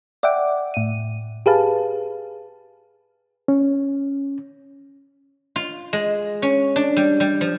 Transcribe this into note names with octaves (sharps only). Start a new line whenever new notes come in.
D5 E5 F#5 G5 D6
A2 D#7
G4 G#4 B4 F5 A5
C#4
F4
G#3
C#4
D4
G3
G3
F3